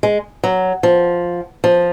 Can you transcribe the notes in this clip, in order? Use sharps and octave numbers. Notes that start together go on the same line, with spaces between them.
G#3
F#3
F3
F3